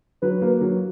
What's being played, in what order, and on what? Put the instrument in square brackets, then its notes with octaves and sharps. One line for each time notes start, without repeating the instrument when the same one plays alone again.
[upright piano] F#3 [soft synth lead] B4
[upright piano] A#3
F#3